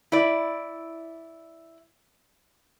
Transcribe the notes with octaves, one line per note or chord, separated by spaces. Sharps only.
E4 D5